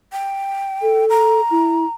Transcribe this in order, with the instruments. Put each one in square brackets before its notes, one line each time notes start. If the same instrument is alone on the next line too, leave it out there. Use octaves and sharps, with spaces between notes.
[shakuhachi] G5
[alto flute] A4
[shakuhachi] A#5
[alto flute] E4